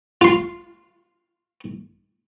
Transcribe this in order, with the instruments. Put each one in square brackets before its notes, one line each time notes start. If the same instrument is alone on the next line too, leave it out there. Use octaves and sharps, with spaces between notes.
[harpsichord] F4 C6